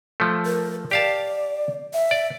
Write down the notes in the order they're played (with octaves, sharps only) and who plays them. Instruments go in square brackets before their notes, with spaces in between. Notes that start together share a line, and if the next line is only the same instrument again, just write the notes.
[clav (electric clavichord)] F3 A3
[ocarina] A#4
[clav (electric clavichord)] G4 F5 A5 [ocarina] D5
[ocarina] E5
[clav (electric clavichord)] D5